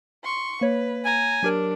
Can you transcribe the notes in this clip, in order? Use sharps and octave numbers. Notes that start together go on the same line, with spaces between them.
C6 C#6
A#3 B4 C#5
G#5 A#5
F#3 D4 G4 A#4